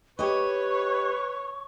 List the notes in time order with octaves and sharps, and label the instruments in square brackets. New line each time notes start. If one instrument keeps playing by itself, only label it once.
[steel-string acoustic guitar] G4 D#5 [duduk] B4 [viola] C#5 [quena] C#6